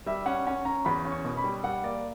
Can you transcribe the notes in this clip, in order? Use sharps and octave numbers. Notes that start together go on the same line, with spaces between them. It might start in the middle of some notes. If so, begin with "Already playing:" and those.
G3 E5
C#4 F#5
C#4 F#5
C#4 A#5
E2 B5
C#4
C#6
B2
B5
G3
G3 F#5
A#3 D5